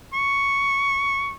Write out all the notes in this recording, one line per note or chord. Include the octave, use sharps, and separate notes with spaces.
C#6